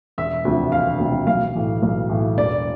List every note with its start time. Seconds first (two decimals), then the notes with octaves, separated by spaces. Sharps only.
0.18 E1 E5
0.45 D2 C3 F3
0.72 E1 F5
1.00 D2 C3 F3
1.27 B1 F5
1.55 A2 E3
1.83 B1
2.10 A2 E3
2.38 E1 D5